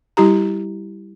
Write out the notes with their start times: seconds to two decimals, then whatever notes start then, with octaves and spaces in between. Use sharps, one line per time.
0.17 G3 E4 G4 A#5